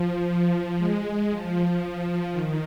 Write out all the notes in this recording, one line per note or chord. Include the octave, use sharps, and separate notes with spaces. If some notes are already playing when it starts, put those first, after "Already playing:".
Already playing: F3
G#3
F3
D#3